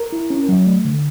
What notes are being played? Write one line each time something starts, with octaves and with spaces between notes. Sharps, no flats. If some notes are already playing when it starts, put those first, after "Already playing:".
Already playing: A#4
E4
C#4
F#3
A3
D3